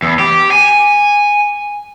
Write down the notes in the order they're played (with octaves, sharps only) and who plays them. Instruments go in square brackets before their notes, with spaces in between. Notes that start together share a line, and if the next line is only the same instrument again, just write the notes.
[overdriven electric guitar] E2
G4
G#5